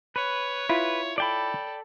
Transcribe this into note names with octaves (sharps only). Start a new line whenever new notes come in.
B4 C#5
E4 F4 B4
A4 D5 G5 B5